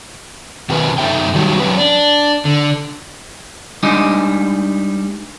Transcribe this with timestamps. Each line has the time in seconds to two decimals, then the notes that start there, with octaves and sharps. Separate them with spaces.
0.69 B2 D#3 C#4 A#4 B4
0.98 F#2 D#4 A4 E5 G5
1.34 D#3 F#3 G3
1.60 F#3 C#4 B4
1.78 D4
2.45 D3
3.83 G3 G#3 D4 D#4 D#5